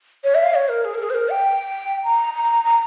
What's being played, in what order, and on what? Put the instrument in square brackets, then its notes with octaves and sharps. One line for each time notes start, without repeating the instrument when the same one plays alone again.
[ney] C#5
E5
F5
C#5
A#4
G#4
A#4
G#4
C5
A#4
G5
A#5
A#5
A#5